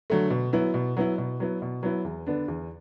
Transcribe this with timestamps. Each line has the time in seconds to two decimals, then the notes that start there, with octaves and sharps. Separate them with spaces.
0.10 D3 F#3 A3
0.30 B2
0.53 F#3 B3 E4
0.74 B2
0.97 F#3 B3 E4
1.18 B2
1.40 F#3 B3 E4
1.62 B2
1.83 F#3 B3 E4
2.04 E2
2.27 D3 B3 D4
2.48 E2